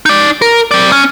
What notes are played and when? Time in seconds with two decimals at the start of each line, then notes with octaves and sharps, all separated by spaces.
0.06 D#4 D5
0.42 A#4
0.71 C4 D5
0.92 C#4